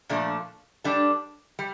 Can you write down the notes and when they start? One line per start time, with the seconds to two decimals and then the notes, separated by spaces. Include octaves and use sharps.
0.09 A#2 F3 A3 D4
0.84 G3 D4 A4
1.59 G3